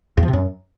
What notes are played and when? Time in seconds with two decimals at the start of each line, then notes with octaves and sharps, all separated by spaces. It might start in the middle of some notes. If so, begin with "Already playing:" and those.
0.17 E2
0.23 F3
0.28 C3
0.33 F#2